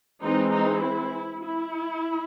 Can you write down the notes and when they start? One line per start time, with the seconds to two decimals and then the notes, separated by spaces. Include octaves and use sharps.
0.23 E3 G#3 C4 D#4
0.53 D#4
0.83 E4
1.43 E4